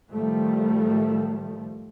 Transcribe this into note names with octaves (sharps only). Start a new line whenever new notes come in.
A2 D#3 F3 G3 A3